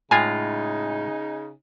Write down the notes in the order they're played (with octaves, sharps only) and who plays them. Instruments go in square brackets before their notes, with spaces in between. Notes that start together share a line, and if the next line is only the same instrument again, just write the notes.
[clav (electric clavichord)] A2 G#3 F4 [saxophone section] C#3 D#4 [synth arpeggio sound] G#5